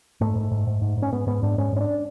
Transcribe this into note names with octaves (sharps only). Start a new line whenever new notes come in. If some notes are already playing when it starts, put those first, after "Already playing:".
G#2 A3
G#2
G#2
G#2
G#2
G#2 C#4
G#2 B3
G#2 B3
G#2 D4
G#2 C#4
G#2 C#4
D4